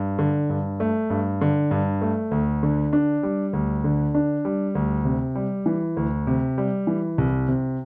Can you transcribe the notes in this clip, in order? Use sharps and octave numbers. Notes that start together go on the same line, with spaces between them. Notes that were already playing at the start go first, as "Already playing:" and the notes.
Already playing: G2
D3
G2
A3
G2
D3
G2
A3
D2
D3
D4
G3
D2
D3
D4
G3
D2
C3
G3
E3
D2
C3
G3
E3
C2
C3